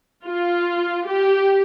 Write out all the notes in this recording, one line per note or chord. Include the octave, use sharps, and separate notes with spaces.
F4
G4